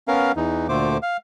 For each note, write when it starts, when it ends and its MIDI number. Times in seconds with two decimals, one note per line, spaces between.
0.08 0.32 59
0.08 0.32 61
0.08 0.32 70
0.08 0.32 77
0.36 0.67 40
0.36 0.67 52
0.36 0.67 63
0.69 0.97 38
0.69 0.97 46
0.69 0.97 50
0.69 0.97 57
0.69 0.97 72
0.69 0.97 86
1.03 1.17 77